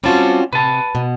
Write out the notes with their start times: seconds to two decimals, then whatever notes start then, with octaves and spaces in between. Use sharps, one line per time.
0.04 G3 C4 C#4 F4 F#4 A5
0.53 C3 B4 A5
0.95 B2